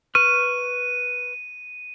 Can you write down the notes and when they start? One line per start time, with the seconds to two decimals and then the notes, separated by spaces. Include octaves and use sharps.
0.15 B4 C#6 F6 D#7